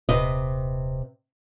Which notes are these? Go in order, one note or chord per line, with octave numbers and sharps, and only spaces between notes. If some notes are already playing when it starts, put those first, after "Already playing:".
D#1 C3 B4 D#5